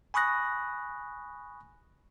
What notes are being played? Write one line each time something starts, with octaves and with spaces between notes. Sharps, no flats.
G#5 B5 C#6 D#6 F#6 A#6